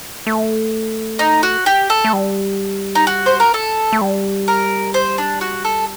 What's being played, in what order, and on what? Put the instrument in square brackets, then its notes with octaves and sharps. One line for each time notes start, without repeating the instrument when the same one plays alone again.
[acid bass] A3
[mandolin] D#4
F#4
G4
A4
[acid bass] A3
G3
[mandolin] D#4
F#4
C5
A#4
A4
[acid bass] A3
G3
[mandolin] A#4
C5
D4
F#4
A4